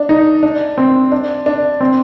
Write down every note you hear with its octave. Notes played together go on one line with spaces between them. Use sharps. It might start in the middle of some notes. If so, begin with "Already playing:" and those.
Already playing: D4
D#4
D4
C4
D4
D4
C4